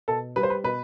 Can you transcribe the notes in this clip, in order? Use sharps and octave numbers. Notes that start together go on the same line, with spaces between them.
B2 A4
G3 B4
C5
B4
B2 B4